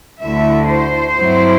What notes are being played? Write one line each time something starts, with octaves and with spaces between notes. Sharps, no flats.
D2 D3 A3 E4 E5
C5
G2 F#3 C4 E4